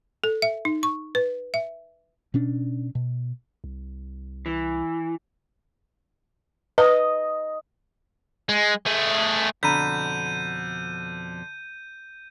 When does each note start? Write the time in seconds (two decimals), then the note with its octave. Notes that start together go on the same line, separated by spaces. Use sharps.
0.24 A4
0.42 E5
0.65 D#4
0.83 C#6
1.15 B4
1.54 E5
2.34 B2 C#4 D4
2.95 B2
3.64 C2
4.46 E3
6.78 B4 D#5
8.49 G#3
8.86 A3 G#4
9.63 F2 B2 D3 A#5 B5 G6 B6 D#7